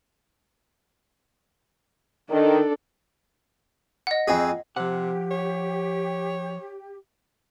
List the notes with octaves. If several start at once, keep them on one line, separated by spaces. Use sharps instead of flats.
D#3 D4 A4
D#5 F#5
F2 C4 G#4
C3 F3 G4 F#5
C#5